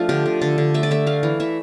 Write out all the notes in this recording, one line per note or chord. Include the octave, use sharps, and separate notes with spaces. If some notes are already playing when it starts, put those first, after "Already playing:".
Already playing: F3 A3 D4 F4
D3 G4
D3
D3 A4
D3
A3 E5
D5
A3 E5
A3 F5
E3
E3 E5